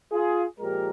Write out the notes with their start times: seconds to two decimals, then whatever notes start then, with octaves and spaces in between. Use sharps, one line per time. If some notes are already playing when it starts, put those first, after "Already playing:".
0.12 F4 G#4
0.59 A#2 F3 G#3 G4 A#4